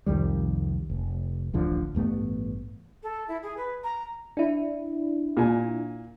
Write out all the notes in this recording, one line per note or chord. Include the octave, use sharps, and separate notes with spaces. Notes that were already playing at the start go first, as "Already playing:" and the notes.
C2 F2 D#3 G3
F1
D1 A1 D3 F3
A1 G2 A3 B3
A4
E4
G#4
B4
A#5
D4 E4
A#2 G#5